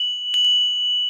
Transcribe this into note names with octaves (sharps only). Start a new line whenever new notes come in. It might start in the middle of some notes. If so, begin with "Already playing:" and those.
Already playing: F#7
F#7
F#7